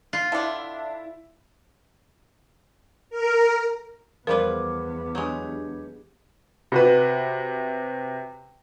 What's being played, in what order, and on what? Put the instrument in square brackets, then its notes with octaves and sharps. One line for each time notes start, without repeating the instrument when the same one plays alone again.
[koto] F4
[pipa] D3 D4 [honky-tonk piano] E4
[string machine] A#4
[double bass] E2 B3 [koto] F3 G3 B4 [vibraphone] G#4 D6 [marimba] A#4
[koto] F#3 G#3 [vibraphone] D4 G4 G#4
[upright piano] C3 F#4 B4